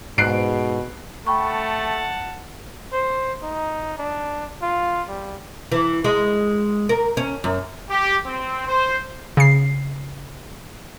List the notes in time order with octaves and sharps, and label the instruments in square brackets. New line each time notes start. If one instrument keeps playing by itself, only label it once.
[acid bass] G#2 [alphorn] B2 [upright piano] F#6 C7 D7
[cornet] A3 [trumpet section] F#5 A5 [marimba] G5 B5 C#6
[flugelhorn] C5
D#4
D4
F4
G3
[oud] E3
G#3
A#4
C#4
F#2
[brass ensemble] G4
C4
C5
[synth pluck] C#3 C7